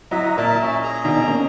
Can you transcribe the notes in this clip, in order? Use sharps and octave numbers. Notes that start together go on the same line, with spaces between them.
F#3 E4 D#5 E5 A#5
A#2 A#4 E5 A5
C#4
G#4 A#5
B2 D#3 D4 D#4
A#3 C#4